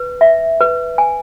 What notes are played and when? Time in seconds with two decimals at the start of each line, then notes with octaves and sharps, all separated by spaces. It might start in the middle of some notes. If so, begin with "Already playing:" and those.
Already playing: B4
0.21 E5
0.61 B4
0.98 G#5